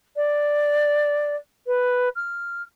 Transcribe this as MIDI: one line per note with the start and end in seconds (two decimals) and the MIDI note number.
0.16 1.36 74
1.67 2.09 71
2.16 2.62 89